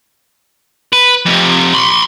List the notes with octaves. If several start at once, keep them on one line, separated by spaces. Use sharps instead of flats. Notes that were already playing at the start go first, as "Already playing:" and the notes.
B4
F2 C3
B5 C6